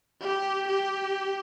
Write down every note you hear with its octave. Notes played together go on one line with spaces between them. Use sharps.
G4
G4